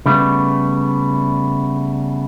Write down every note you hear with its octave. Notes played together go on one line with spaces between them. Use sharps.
C#3 G3 A3 B3